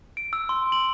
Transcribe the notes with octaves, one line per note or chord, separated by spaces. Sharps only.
D7
E6
C6
F#7